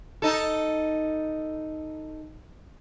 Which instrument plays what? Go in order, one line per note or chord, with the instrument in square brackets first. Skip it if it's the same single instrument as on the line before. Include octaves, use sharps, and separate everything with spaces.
[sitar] D#4 A4